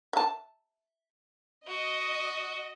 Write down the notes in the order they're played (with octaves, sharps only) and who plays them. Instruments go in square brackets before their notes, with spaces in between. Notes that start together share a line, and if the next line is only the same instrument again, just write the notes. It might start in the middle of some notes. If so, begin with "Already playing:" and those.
[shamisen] E5 A5
[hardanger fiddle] F#4 [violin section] D#5